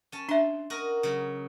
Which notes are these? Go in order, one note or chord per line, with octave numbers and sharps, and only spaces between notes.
C#4 A5
D4 E5 C6
F#4 A#4 D#5
C#3 F#3